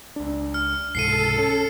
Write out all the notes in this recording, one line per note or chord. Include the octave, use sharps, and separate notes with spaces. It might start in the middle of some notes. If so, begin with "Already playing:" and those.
C#2 D4
F6
C#2 G#2 C3 A4 C7 C#7 D#7
C#4